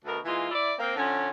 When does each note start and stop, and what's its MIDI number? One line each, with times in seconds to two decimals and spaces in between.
0.05 0.17 38
0.05 0.17 47
0.05 0.17 62
0.05 0.17 70
0.25 0.48 52
0.25 0.48 56
0.25 0.48 58
0.25 0.48 65
0.50 0.73 64
0.50 0.73 74
0.79 0.93 58
0.79 0.93 60
0.96 1.29 50
0.96 1.29 53
0.96 1.29 61